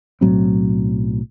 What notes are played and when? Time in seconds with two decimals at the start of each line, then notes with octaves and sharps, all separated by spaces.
0.21 B1 A2 F#3 C4